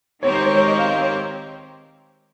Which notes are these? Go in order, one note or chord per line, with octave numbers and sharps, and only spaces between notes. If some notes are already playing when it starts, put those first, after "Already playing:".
D#3 G#3 C4 G4 A#4 C#5
C5
C#5
C#5
D#5
F5
D#5
C#5